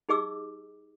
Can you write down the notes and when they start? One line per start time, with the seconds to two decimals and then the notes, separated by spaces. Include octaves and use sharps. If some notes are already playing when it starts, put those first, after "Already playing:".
0.09 D#4 G4 G#4 D#5 D6 E6